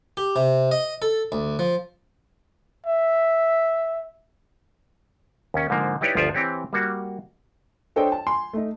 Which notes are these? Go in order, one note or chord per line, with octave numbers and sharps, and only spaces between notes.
G4
C3
D#5
A4
D2
F3
E5
D#2 C#4
G#2 D3 F3 A#3
D#4 E4 G4 B4 C#5 D5
G1 D2 F3 F4 D5 E5
E3 C4 G4 C#5
G3 A#3 F#4
D4 A4 C5 C#5 D#5 G5
A5
G#5 C6
A3 D#4